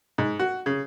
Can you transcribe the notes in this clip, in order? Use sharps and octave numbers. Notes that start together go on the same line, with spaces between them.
G#2
F#4
C#3